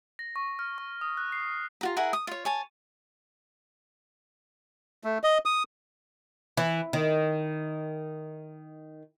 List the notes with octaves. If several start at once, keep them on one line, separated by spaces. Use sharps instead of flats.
A#6
C#6
F6
C#6
D#6
F#6
C7
F4 F#4 A#5
E4 G#4 A#4 F#5
D#6
F4 C#5
C#5 G#5 A5
A3
D#5
D#6
E3
D#3